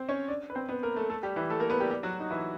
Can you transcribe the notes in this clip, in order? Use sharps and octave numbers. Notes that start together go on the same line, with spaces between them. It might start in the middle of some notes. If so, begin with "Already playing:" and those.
Already playing: C4 C5
C#4 C#5
D4 D5
B4
C4 C5
B3 B4
A#3 A#4
A3 A4
A3 A4
G3 G4
E3 E4
A3 A4
A#3 A#4
B3 B4
G3 G4
G3 G4
F#3 F#4
D#4
E3 E4